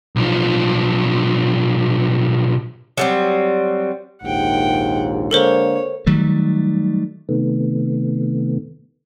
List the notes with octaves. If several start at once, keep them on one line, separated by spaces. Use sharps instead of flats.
B1 F3
F#3 G3 C4
A#1 D#2 G#2 F#5 G5
D3 G#3 A#3 A4 A#4 C5 C#5
D#3 F#3 G3 A3
C3 D#3 A3 B3